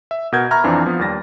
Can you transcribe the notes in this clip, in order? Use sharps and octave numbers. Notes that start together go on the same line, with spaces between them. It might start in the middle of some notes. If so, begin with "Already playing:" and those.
E5
B2 A#4 F#5 G6 G#6
E5 A#5 B5 C#6 F6 G#6
F2 E3 C4 D4 F4 A#5
F3 B3
D#2 G3 A6 A#6